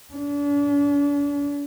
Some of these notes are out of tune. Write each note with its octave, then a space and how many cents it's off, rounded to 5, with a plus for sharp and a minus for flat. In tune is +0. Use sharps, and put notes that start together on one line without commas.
D4 -40